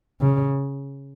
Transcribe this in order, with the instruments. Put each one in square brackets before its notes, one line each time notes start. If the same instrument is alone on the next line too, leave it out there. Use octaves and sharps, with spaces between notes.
[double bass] C#3